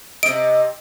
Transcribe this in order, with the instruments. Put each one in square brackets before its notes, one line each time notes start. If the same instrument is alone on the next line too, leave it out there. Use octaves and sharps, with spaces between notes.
[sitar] C3 D#5 [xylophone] D7